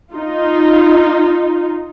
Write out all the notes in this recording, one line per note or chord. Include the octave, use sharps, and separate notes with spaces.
D#4 F4